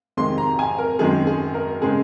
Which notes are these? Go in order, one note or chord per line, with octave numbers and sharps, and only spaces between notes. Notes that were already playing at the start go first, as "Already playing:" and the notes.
F2 C3 D#3 G#3 C6
A#5
G#5
A#4
F#2 D#3 G#3 C4 G#4
G#4
A#4
C#3 G#3 C4 G#4